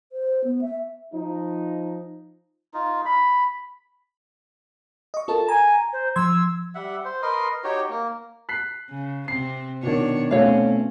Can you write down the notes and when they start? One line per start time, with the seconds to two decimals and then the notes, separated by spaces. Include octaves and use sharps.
0.12 C5
0.44 B3
0.61 E5
1.13 F3 D#4
2.74 D#4 F4
3.05 B5
5.14 D#5 C#6
5.28 F4 A4 A#4 A5
5.48 G#5 A#5
5.93 C5
6.16 F3 C6 E6 G#6
6.75 G3 E5 F#5
7.05 C5
7.22 A#4 B4 D#5 C6
7.64 D#4 F#4 G4 C#5
7.89 A#3
8.49 F#6 B6 C7
8.90 C#3
9.28 C3 C4 C7
9.83 B2 D#3 D4 C#5
10.31 B2 A3 C4 C#4 C#5 F5